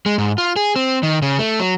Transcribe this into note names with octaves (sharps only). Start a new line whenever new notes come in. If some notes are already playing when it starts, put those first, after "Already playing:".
G#3
G#2
F4
G#4
C4
D#3
C#3
A3
F#3